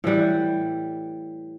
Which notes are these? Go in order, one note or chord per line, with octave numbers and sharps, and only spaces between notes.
A2 E3 G3 F#5